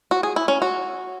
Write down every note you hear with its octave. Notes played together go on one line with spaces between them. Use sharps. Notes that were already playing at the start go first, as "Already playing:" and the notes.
F#4
G#4
E4
C#4
F#4